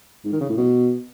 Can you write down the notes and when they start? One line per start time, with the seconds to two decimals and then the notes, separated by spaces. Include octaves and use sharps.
0.24 G#2
0.33 D#3
0.41 C#3
0.49 A2
0.57 B2